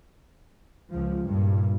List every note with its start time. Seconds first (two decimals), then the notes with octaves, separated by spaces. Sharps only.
0.91 C#2 F3
1.25 G2 A#2